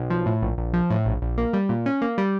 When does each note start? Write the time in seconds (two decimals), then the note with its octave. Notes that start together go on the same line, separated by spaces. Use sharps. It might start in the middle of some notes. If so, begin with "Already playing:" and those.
Already playing: B1
0.10 F3
0.26 A2
0.42 A#1
0.58 A#1
0.73 F3
0.90 A2
1.05 A#1
1.22 A#1
1.38 A#3
1.53 G3
1.69 A#2
1.86 C#4
2.02 A#3
2.18 G3